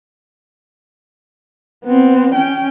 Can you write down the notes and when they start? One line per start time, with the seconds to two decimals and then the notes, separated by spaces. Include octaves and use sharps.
1.85 B3 C4
2.35 C#4 G5